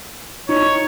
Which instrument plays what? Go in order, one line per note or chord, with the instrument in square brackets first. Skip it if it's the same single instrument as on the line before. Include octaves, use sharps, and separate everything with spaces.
[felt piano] D#4 [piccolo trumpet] C#5